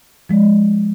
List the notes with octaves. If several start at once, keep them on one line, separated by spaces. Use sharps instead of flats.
F3 G#3